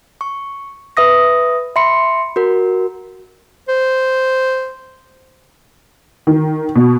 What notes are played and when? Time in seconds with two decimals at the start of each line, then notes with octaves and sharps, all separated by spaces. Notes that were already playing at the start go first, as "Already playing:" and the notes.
0.21 C#6
0.97 B4 E5 D#6 A#6
1.76 E5 B5 C6 C#7
2.36 F#4 A#4
3.68 C5
6.27 D#3
6.76 B2